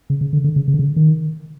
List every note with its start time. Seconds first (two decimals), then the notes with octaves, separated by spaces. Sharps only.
0.10 C#3
0.21 C#3
0.33 D3
0.44 D3
0.56 C#3
0.68 C#3
0.74 D3
0.79 C#3
0.96 D#3